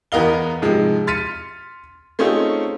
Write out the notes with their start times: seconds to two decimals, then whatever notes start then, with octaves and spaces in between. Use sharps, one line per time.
0.12 E2 B3 A#4 D#5 F5 G7
0.62 G#2 C3 F3 G#3
1.07 C6 F6 A6 B6 C#7 D#7
2.19 A3 C4 C#4 D#4 F4 G#4